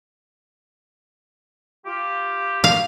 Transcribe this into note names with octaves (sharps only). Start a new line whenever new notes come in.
F4 G4
F5